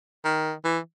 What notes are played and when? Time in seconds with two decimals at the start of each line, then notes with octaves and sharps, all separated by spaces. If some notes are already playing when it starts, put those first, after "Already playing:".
0.24 D#3
0.65 E3